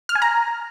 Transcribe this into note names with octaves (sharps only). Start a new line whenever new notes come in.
F6
G#5
A#5